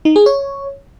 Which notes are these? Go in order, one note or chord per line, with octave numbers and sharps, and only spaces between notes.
D#4
G#4
C#5